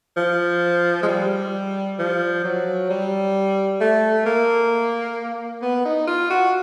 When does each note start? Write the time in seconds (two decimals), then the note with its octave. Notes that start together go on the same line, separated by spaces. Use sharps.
0.17 F3
1.03 G#3
1.08 G3
1.99 F3
2.44 F#3
2.90 G3
3.81 A3
4.26 A#3
5.62 B3
5.85 D#4
6.07 F4
6.30 F#4